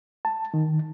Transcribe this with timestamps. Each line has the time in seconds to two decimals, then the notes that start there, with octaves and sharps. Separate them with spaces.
0.25 A5
0.54 D#3